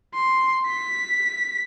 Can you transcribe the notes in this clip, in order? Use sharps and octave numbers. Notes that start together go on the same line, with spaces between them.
C6
B6